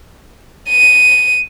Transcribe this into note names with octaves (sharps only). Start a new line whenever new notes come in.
D#7